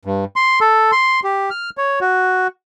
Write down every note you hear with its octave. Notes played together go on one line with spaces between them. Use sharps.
G2
C6
A4
C6
G4
F6
C#5
F#4